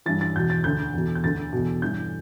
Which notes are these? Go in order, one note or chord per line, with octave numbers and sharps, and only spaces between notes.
G2 E3 A6
A6
E2 B2 G6
A6
D2 D3 G6
E2 B2
G6
D2 D3 A6
E2 B2
G2 E3 G6